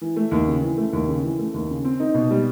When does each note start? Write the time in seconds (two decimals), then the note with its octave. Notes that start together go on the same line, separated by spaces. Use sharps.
0.01 E3
0.16 A3
0.31 D#2
0.47 C#3
0.62 E3
0.77 A3
0.93 D#2
1.08 C#3
1.24 E3
1.39 A3
1.54 D#2
1.70 C#3
1.84 C4
2.00 D#4
2.15 B2
2.31 G3